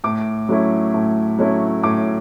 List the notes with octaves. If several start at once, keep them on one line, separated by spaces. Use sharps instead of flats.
A2 D6
F#3 A3 C#4 E4
A2
F#3 A3 C#4 E4
A2 D6